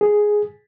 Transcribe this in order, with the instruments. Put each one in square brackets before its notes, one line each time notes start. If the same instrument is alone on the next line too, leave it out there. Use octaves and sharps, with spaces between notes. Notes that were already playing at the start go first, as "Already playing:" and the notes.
[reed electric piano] G#4